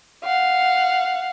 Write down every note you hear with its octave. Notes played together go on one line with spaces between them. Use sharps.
F5 F#5